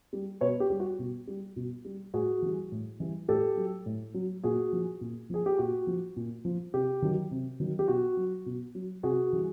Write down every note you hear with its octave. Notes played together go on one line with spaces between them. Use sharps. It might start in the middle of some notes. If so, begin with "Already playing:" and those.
G3
B2 B4 C#5
G4
G3
F#4
B2
G3
B2
G3
A2 F#4 G#4
E3 G3
A2
E3 G3
A2 G4 A4
F#3
A2
F#3
A#2 F#4 G#4
F3
A#2
F3 G#4
G4
A#2 F#4
F3
A#2
F3
C3 G4
D#3 F#3
C3
D#3 F#3
G4
B2 F#4
F#3
B2
F#3
C3 F#4 G#4
E3 G3